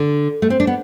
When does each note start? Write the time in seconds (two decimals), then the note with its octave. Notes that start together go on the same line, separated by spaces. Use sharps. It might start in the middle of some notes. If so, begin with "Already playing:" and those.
Already playing: D3
0.42 A3
0.50 C4
0.60 D4
0.67 B3